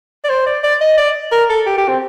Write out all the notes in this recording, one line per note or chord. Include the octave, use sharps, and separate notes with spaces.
D5
C5
D5
D5
D#5
D5
A#4
A4
G4
G4
C4